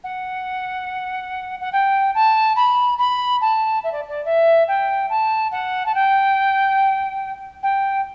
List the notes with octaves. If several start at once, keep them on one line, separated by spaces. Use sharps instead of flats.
F#5
F#5
G5
A5
B5
B5
A5
E5
D5
D5
E5
G5
A5
F#5
A5
G5
G5